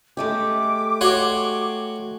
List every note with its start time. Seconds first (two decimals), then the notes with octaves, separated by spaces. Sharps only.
0.17 G#3 A3 G4 D6
1.01 F#4 C#5 C6